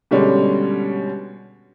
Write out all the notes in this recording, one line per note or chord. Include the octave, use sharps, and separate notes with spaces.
B2 D3 G3 G#3 C#4